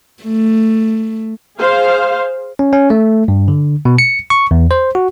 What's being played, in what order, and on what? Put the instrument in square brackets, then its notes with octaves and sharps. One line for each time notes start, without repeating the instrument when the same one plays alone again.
[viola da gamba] A3
[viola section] G#4 C5 F5
[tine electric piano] C#4
C#4
A3
G2
D3
B2
C#7
C#6
E2
C5
F#4